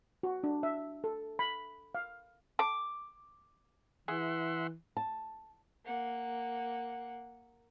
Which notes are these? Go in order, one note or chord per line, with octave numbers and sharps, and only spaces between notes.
F#4
D4
E5
A4
B5
F5
A5 D6
E3 G#4 E5 F#5 C6
A5
A#3 F#5